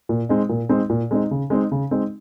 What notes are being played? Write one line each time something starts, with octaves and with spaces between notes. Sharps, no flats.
A#2
G#3 C4 D#4
A#2
G#3 C4 D#4
A#2
G#3 C4 D#4
C#3
G#3 C4 D#4
C#3
G#3 C4 D#4